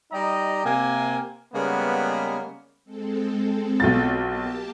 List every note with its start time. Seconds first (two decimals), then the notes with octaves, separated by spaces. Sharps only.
0.12 G3 D#4 G4 D5 D#5 A#5
0.65 C3 A#3 G#5
1.54 C#3 G3 G#3 A#3 B3
2.85 G#3 C4 A4
3.80 B1 F4 A6
4.25 A#3 G4 A5